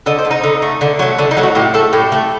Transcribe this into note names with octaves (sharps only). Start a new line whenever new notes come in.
D3 D#5
C5
A3
D#4
D3
A3
D3
F#3 A3
D3 D4
D#4
F#3 A3
F#4
A2 G4
A3 A4
A2 G4
A3